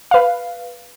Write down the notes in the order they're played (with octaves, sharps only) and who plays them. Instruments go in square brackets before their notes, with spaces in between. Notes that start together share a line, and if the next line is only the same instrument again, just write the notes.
[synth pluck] B4 F5